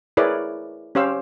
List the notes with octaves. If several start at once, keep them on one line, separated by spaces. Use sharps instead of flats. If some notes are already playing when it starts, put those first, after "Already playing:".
E4 G#4 A#4 B4 C#5 D5
C#4 G4 C5 F5 E6